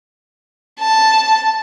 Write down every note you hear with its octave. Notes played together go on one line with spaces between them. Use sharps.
A5